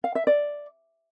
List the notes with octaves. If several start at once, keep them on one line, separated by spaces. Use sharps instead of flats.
F5
E5
D5